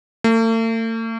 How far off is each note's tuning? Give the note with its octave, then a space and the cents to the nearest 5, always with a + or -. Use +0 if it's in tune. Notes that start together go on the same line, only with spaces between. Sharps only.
A3 +45